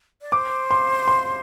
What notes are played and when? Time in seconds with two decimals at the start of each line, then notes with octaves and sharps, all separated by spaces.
0.21 D5
0.32 C5 D6
0.71 C6
1.08 C6